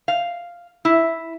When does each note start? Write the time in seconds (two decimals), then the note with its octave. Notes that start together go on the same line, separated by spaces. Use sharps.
0.08 F5
0.85 E4